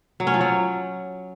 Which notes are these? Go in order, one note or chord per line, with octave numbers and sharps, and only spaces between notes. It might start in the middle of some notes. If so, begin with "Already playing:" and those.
F#3
C#4
F3
F#3